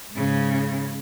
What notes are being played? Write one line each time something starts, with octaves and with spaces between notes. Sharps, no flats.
G#2 C#3